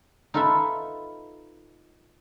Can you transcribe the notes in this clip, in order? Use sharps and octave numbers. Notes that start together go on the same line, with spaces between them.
D#4 F4 A4 B4 E5